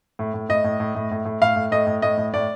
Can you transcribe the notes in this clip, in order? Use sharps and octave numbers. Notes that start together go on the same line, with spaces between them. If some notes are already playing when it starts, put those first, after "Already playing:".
A2
A2
A2 D#5
A2
A2
A2
A2
A2
A2 F5
A2
A2 D#5
A2
A2 D#5
A2
A2 D5